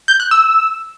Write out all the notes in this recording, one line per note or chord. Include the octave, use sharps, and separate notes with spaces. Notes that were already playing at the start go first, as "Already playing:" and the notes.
G6
F#6
E6